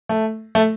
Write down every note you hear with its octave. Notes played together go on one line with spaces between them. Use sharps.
A3
A3